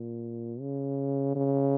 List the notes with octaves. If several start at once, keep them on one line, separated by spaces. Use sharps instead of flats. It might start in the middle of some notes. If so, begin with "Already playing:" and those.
Already playing: A#2
C#3
C#3